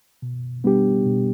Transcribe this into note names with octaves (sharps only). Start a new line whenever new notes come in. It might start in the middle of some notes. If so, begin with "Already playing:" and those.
B2
G3 B3 D4 G4
B2